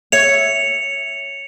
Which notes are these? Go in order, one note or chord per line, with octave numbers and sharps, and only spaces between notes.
C#5 E5 C#7 F7